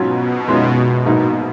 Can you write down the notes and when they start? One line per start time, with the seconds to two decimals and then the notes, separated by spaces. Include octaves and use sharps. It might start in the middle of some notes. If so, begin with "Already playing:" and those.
Already playing: G#2 B2 F#3 C#4 F4
0.48 F#2 D#3 G#3 C#4 F4
1.06 A#1 G#2 B2 F#3 A#3 D#4